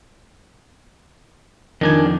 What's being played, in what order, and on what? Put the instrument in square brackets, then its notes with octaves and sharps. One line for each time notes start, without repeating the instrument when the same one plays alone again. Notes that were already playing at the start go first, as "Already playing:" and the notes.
[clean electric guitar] F2 [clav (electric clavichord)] D#3 D4 G#5